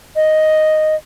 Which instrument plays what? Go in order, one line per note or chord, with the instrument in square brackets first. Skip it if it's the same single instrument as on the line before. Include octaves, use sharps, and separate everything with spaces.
[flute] D#5